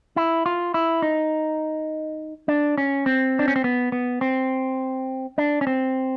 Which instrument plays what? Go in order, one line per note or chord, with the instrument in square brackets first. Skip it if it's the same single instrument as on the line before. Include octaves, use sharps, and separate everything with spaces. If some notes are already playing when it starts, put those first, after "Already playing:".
[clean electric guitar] E4
F4
E4
D#4
D4
C#4
C4
D4
C#4
C4
B3
B3
C4
D4
C#4
C4